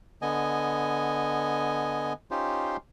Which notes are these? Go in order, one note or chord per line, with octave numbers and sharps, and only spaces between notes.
D3 B3 D#5 G#5
C#4 D#4 F4 G4 C5